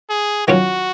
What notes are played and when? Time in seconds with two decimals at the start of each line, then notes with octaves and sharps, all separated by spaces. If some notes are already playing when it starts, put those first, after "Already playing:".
0.10 G#4
0.47 D#3 F#3 C#4 F4 F#4